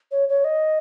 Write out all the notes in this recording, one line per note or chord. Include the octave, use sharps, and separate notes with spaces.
C#5
C#5
D#5